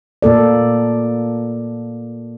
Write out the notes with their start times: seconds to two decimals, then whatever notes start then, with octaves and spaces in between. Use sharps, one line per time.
0.22 A#2 A#3 A4 D5